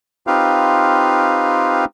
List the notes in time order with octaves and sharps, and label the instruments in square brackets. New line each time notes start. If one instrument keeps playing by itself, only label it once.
[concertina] C4 D#4 F4 G4 B4 F5